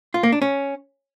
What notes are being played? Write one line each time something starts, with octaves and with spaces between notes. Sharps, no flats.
F4
A#3
D4
C#4